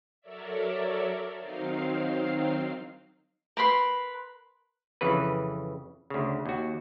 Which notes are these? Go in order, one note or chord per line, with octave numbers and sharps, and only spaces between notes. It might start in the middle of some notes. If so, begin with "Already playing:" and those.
F#3 A4 A#4 C#5 D5 E5
D#3 F#3 C4 D#4 F5 C7
A#4 B4 B5 C6
F2 C#3 E3 B4
D2 C#3
D#2 F#4